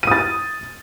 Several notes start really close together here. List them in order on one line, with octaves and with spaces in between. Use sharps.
D#7 D#6 A6